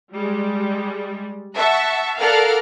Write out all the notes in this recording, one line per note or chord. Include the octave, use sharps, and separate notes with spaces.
G3 G#3
E5 F#5 A5 C#6
A4 A#4 D5 F5 F#5 F6